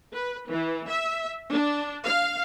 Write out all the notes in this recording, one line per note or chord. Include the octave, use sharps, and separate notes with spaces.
B4
E3
E5
D4
F5